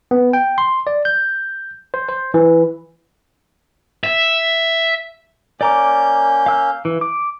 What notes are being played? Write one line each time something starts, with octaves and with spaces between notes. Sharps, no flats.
B3
G5
C6
D5
G6
C5
C5
E3
E5
A#3 C#4 D5 A#5 D6 G6
F5 E6 F6
E3
D6